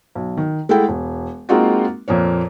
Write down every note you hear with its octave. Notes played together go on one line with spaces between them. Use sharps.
B1
D#3
G#3 A3 E4 A4 F#5 G5
E1
G#3 A#3 C4 D#4 F4 F#4
F2 A#2 A#3 C#5